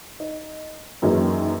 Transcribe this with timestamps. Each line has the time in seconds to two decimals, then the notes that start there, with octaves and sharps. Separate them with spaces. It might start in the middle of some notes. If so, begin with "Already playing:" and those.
0.20 D#4
1.02 F#2 A#2 D#3 E3 F#3 G#3